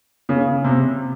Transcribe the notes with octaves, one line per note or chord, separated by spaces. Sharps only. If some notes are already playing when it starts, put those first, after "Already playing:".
C#3
C3